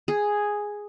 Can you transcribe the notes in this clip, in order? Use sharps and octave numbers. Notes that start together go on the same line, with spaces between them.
G#4